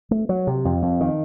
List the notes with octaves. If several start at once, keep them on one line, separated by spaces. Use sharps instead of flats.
A3
F#3
C3
F2
F2
D#3